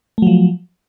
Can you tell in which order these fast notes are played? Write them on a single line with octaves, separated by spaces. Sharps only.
A3 F#3 F3